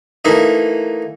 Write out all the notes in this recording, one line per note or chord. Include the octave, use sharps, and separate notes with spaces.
E3 A3 A#3 D#4